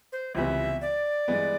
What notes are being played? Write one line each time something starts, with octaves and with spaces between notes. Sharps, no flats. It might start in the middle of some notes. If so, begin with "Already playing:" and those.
C5
C#2 C3 E3 G3 B3 E5
D5
G2 E3 G#3 B3